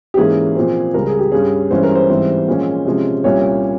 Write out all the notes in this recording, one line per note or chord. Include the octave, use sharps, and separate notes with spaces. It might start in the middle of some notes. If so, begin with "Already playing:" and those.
G4
G#2 E3 A#3 C#4 G#4
A#2 F3 C4
C#2 C#3 G3 A#4
G#4
G4
G2 G3 C#4 G#4
G2 E3 G#3 C#4 C5
A#4
C5
G#2 E3 G3 C4
A#2 F3 G#3 C#4
C3 F3 G#3 C#4
C2 A#2 G3 C#4 C#5